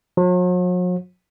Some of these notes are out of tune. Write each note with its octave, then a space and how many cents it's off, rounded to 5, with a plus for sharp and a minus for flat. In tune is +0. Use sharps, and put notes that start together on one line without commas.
F#3 -45